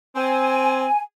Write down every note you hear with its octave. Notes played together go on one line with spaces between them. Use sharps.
C4 G#5